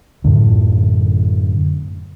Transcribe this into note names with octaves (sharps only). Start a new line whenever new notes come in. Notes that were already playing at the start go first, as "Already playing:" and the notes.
F#2 A2 D3